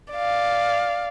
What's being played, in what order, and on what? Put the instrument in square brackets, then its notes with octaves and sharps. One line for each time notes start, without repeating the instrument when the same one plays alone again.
[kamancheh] D5 F5